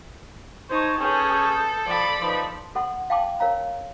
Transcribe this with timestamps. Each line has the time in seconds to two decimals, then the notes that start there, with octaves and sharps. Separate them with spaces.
0.70 D#4 C5 A5 C#6 G#6
1.01 C#4 G#4 A4 B4 D#6 G6
1.87 F3 D5 B5
2.20 F3 D#4 B4
2.75 A4 F#5 C6
3.10 F5 G5 A5 C6 D6
3.40 A#4 C#5 F5 A#5